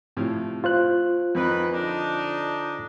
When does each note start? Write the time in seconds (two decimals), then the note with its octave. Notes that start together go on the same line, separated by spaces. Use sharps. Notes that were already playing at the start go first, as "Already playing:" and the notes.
0.17 A2 C3 F3
0.64 F4 C5 F#6
1.35 F2 D#3 E3 B4
1.72 D3 D4 D#4